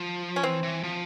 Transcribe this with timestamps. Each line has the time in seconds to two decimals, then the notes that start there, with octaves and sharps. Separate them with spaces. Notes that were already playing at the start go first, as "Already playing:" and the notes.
Already playing: F3
0.36 C#4
0.43 E3 C4
0.63 E3
0.83 F3